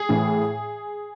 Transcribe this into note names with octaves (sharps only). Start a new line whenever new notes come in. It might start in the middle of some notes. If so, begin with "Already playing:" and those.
Already playing: G#4
A2 E3